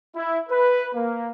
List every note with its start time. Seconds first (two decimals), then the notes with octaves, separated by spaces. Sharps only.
0.16 E4
0.49 B4
0.95 A#3